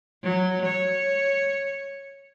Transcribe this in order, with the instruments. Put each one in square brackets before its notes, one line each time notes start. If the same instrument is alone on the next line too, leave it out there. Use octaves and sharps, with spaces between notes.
[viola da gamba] F#3
C#5